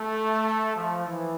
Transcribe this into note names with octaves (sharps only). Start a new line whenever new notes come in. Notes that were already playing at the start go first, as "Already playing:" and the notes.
Already playing: A3
F3
E3